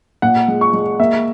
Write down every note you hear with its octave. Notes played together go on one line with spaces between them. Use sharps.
A#2 F#5
G#3
C#6
G#3
A#3 E5